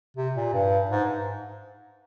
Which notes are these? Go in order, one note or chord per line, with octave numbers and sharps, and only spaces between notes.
C3
A#2
G2
G#2